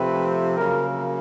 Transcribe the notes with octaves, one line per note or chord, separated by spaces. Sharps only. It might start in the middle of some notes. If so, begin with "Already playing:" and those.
Already playing: C3 F3 A3 C4 B4
C#3 F#3 A#3 A#4